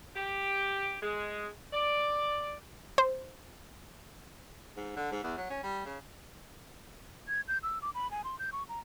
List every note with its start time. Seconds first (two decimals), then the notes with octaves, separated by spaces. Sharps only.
0.15 G4
1.02 G#3
1.73 D5
2.98 C5
4.77 G#2
4.97 D3
5.12 G#2
5.24 E2
5.37 F#3
5.50 C#4
5.63 G3
5.86 C#3
7.28 G#6
7.48 G6
7.63 E6
7.82 D6
7.95 B5
8.11 G#5
8.24 C6
8.39 G6
8.52 C#6
8.69 A#5